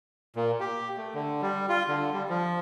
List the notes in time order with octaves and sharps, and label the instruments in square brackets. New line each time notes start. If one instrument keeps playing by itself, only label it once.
[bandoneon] A#2
G4
A3
D3
G3
F4
D3
G3
F3